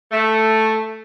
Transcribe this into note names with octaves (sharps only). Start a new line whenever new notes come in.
A3